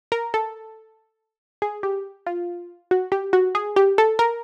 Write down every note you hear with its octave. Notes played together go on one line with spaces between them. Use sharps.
A#4
A4
G#4
G4
F4
F#4
G4
F#4
G#4
G4
A4
A#4